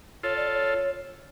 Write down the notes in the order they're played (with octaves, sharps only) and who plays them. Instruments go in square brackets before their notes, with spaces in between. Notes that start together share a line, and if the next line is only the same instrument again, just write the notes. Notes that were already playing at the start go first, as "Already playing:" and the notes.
[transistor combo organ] F4 A4 [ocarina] C#5
[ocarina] D5
C#5